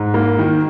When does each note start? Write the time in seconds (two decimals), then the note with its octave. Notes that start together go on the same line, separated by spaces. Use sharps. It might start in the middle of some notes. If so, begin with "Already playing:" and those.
Already playing: G#2
0.14 A#3
0.39 D#3